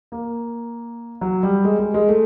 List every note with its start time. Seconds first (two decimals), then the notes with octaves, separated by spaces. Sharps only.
0.12 A#3
1.21 F#3
1.43 G3
1.64 G#3
1.79 G#3
1.94 G#3
2.09 A3